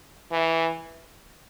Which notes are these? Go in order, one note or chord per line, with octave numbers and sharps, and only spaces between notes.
E3